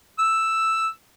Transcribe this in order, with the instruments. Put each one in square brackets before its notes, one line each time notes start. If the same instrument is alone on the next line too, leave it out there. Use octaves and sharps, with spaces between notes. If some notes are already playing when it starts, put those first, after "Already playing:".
[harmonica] E6